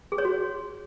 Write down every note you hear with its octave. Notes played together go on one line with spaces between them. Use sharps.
G#4
C#5
F#4